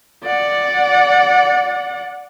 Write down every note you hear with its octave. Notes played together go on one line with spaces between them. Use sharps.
D5 F#5